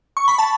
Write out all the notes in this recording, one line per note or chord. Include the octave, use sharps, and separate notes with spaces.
C#6
B5
A5